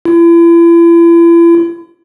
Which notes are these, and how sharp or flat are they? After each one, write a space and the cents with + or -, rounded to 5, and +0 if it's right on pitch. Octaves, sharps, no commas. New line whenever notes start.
E4 +40